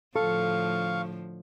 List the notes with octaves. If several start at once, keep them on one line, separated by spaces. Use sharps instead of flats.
A2 D3 F3 A4 F5 C#6